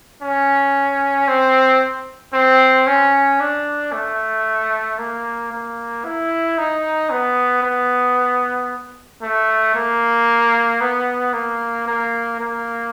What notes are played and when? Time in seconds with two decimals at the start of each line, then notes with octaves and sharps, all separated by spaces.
0.22 C#4
1.28 C4
2.33 C4
2.86 C#4
3.40 D4
3.92 A3
4.98 A#3
5.51 A#3
6.05 E4
6.58 D#4
7.10 B3
7.63 B3
9.22 A3
9.75 A#3
10.81 B3
11.33 A#3
11.87 A#3
12.39 A#3